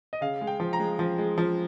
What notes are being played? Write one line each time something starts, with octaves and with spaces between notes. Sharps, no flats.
D#5
C#3 F5
G#3
G5
F3
A#5
G#3
F3
G#3
F3